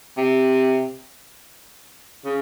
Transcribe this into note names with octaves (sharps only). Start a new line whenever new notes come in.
C3
C#3